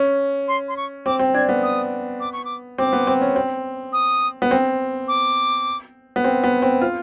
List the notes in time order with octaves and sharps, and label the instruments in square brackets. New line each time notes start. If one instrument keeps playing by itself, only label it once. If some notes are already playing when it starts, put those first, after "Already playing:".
Already playing: [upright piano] C#4
[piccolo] C6
C6
C#6
[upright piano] C4 [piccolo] D6
[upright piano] C4
[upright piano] D4 [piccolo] G#6
[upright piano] B3
[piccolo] D#6
D6
C#6
D6
[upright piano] C4 [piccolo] D6
[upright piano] B3
C4
C#4
C4
[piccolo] D#6
[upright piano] B3
C4
[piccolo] D6
[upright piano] B3
C4
B3
C4
F4